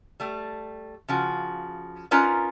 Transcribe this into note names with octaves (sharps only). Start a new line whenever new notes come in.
G3 A3
C#3 F3 F#4
C#4 D#4 F4 A#4 B4 D5